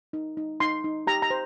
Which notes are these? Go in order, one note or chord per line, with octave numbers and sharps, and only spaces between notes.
D#4
D#4
D#4 C6
D#4
G4 A#5
A#5
C5